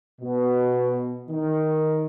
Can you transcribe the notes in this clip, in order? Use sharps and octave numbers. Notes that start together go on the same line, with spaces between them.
B2
D#3